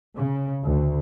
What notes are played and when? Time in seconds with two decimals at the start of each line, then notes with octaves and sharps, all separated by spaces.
0.16 C#3
0.63 D2